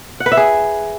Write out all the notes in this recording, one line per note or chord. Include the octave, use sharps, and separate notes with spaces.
F#5
B4
E5
G#4